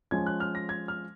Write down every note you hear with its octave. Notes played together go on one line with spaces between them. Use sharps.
F3 G#3 C#4 G#6
F#6
F6
A#6
G#6
F6